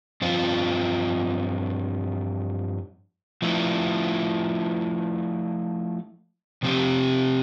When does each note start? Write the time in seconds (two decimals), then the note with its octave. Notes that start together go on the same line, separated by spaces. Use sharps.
0.22 G2 F3 C4 F4
3.42 F3 A3 E4
6.63 C3 F3 C4 G4